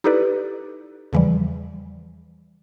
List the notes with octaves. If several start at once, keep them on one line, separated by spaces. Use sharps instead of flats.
D#4 E4 G4 A4 B4 D5
E2 C#3 E3 F3 G3